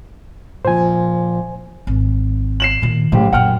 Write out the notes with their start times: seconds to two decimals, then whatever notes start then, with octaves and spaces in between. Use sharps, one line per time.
0.65 A#2 F3 C5 G#5
1.87 G#1
2.60 C7 E7 F#7
2.82 A#2 D#3
3.12 F#1 A2 G4
3.33 F#2 A#2 F#5 G5 F6